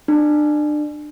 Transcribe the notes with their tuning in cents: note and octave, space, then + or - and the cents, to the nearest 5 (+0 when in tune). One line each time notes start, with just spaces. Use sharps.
D4 +30